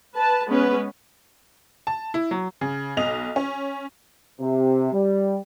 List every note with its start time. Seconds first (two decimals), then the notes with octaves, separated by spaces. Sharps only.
0.15 B4 A5
0.49 G#3 B3 C#4 B4
1.87 A5
2.14 E4
2.31 F#3
2.61 C#3
2.97 B1 D#5 F7
3.36 C#4
4.39 C3
4.93 G3